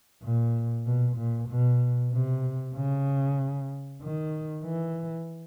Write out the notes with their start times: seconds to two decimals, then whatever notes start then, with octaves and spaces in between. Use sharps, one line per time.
0.23 A#2
0.86 B2
1.17 A#2
1.49 B2
2.11 C3
2.75 C#3
4.01 D#3
4.64 E3